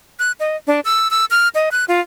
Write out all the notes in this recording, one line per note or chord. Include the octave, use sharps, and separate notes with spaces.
F#6
D#5
D4
E6
E6
F6
D#5
F#6
F4